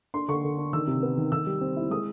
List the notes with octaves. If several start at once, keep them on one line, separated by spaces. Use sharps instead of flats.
D4 C6
D3 C#6
D3
D4
D#3 E6
C3
B3
D#3
D#3 E6
G3
C4
E4
G#3 D#6